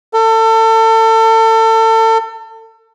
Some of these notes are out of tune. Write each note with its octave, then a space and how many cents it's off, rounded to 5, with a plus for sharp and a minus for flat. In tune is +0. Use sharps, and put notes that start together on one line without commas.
A4 +30